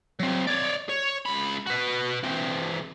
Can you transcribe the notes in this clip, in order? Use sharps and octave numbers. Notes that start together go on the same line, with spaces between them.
F#3 C4
C#5 D5
C#5
C#2 B5
F#4 B4
E3 C4